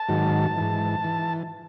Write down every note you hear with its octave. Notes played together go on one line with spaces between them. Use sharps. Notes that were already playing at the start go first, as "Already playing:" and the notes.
Already playing: A5
G#2 D#3 F#3
G#2 E3
E3